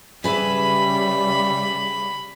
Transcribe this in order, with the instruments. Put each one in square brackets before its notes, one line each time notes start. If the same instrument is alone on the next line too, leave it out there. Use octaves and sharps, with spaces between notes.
[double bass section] C#3 G3 [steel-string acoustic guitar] G#4 B4 E5 [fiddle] B5